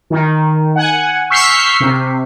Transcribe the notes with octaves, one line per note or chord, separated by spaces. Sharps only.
D#3
F#5 G#5
C#6 E6 F6 G6 B6 C7
C3